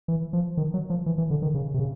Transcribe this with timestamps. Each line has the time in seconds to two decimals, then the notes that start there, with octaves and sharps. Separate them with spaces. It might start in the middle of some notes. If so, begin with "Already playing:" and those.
0.08 E3
0.33 F3
0.57 D#3
0.74 F#3
0.90 F3
1.06 E3
1.18 E3
1.30 D3
1.42 D#3
1.54 C#3
1.74 C3
1.79 C#3